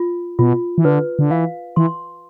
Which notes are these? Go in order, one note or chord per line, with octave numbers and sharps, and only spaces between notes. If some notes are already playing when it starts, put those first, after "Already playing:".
Already playing: F4
B2 F4
E3
D3 B4
D3
E3 F5
E3 C6